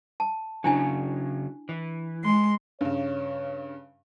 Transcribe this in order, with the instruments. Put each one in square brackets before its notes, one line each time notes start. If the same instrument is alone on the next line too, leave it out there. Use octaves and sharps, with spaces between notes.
[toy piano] A5
[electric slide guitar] C#3 F#3 [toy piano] D4 E4 G#5
[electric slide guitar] E3
[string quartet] G#3 C6
[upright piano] G2 C#3 [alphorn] C#5